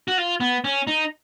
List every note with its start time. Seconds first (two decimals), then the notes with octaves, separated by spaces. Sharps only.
0.08 F#4
0.18 F4
0.40 B3
0.64 C#4
0.87 D#4